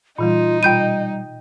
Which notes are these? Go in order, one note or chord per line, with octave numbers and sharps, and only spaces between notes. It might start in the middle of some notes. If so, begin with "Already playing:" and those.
A#2 E3 G3 D#4 F4
B2 G3 F4 G5 B5 G6 D#7